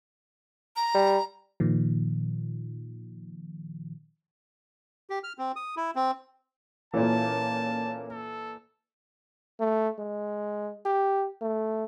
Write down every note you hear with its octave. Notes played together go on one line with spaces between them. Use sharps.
A#5
G3
A#2 D#3 F3
G4
F6
C4
D#6
E4
C4
A#2 E3 A#3 C#4 A4 A5
A4
A3
G#3
G4
A3